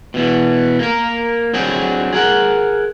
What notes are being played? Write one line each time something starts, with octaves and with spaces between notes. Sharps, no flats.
B2 E3 B3
A#3 A#4
F#3 C4 D4 F#4 G#4
G#4 A#4 F#5